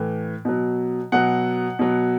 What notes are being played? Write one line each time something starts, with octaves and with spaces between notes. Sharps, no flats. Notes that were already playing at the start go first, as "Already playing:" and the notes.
Already playing: A2 E3
B2 F#3
B2 F#3 F#5
B2 F#3